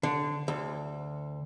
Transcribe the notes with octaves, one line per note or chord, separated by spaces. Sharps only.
D3
D2